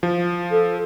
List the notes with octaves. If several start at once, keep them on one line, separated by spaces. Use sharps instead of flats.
F3
A4